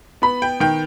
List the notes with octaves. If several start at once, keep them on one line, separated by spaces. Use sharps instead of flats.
B3 B5
G5
D#3 G5